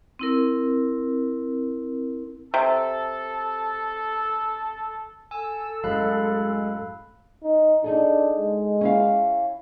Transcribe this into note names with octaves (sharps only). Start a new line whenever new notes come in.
C4 E4 A#4
C3 A4
A4 G#5 E6
F#2 A2 F#3 G#3 F5 B5 F#6
D#4
D4 D#4 G#4 A4
G#3
C#4 E4 F5